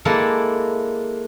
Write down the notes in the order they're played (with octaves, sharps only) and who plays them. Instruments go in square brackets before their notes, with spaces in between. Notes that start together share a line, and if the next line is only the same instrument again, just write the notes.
[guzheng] G#3 A#3 D4 E4 A4